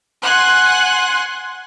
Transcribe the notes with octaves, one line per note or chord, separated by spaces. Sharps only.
F#5 G#5 C6 F#6